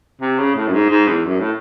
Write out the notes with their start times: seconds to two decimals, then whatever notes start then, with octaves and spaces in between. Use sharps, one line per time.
0.21 C3
0.39 C#3
0.55 A2
0.67 F#2
0.73 G#2
0.90 G#2
1.07 E2
1.25 F#2
1.40 A2